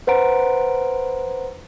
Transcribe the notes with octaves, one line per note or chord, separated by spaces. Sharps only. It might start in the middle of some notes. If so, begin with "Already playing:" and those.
B4 C5 F#5 A#5 D7